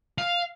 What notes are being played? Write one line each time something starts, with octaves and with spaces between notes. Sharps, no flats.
F5